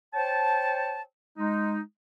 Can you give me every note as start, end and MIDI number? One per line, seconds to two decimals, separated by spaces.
0.14 1.01 72
0.14 1.01 73
0.14 1.01 79
0.14 1.01 81
1.38 1.80 56
1.38 1.80 63